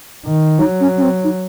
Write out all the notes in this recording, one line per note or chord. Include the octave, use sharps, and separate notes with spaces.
D#3
F#3 D#4
C#4
C#4
C4
D#4